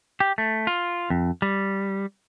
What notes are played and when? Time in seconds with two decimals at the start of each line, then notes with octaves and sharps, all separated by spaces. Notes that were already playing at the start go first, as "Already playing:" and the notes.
0.20 G4
0.38 A3
0.67 F4
1.10 F2
1.42 G3